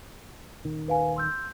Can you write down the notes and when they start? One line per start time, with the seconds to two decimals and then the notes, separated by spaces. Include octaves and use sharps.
0.65 D#1 D#3
0.88 B4 F5 G#5
1.16 C6 E6 G6